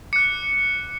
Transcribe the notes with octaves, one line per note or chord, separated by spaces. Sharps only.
D6 F#6 C#7